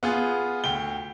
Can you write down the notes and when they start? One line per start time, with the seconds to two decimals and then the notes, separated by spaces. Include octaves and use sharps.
0.03 B3 F4 G#4
0.64 D2 G5 G7